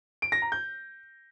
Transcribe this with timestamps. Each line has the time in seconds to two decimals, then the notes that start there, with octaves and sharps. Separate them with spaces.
0.22 D7
0.32 A#6
0.42 A#5
0.52 G6